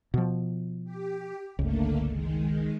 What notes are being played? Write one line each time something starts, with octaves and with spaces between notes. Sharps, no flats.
B2 F3
G4
G1 C#2 D3 A3 A#3
D#3 G#3